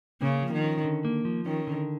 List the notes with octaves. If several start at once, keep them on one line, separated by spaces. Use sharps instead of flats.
C#3 A#3
F3
D#3
C#4
D3
A#3
F3
D#3 C#4
D3